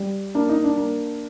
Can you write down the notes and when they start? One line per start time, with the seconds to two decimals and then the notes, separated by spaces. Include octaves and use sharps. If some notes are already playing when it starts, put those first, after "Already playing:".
Already playing: G3
0.35 A#3 D4
0.49 D#4
0.64 D4
0.78 A#3